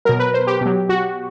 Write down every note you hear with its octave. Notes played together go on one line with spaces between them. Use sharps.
B2 F#3 A#4
B4
C5
G4
B2 F#3
F#4